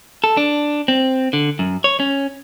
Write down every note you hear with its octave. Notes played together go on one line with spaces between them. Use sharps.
A4
D4
C4
D3
F#2
C#5
C#4